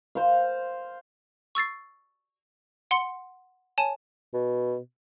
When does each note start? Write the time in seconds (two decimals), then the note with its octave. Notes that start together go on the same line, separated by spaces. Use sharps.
0.15 C5 F5
1.55 C#6 E6 A6 C7
2.91 F#5 C6 C#7 G7
3.78 C#5 G#5 A5
4.34 B2